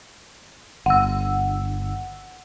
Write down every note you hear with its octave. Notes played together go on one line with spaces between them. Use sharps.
G1 F#5 E6